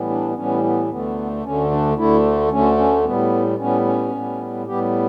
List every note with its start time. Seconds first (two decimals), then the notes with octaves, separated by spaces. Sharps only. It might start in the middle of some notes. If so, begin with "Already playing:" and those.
Already playing: A2 E3 G3 B3
0.10 D4
0.36 A2 E3 G3 B3 C#4
0.64 B3
0.90 D2 D3 A3 B3
1.44 D2 D3 A3 C#4
1.71 D4
1.97 D2 D3 A3 E4
2.51 D2 D3 A3 C#4
2.78 C#4
3.05 A2 G3 B3
3.59 A2 G3 B3 C#4
3.85 C#4
4.12 A2 G3 B3
4.67 A2 G3 B3 G4